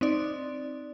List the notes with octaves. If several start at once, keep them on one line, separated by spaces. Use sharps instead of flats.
C4 D#4 D5